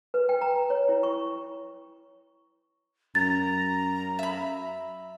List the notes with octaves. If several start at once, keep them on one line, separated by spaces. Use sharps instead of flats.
B4
G5
A#5
C#5
E4
C#6
F#2 A#5 A6
E5 B5